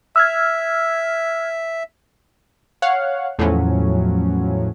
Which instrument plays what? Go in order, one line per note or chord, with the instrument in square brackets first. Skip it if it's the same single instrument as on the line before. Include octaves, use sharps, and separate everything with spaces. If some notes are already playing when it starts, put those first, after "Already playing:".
[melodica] E5 [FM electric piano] E6 F6 G#6
[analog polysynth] C#5 F5 F#5
E2 A2 F3 F#3 C#4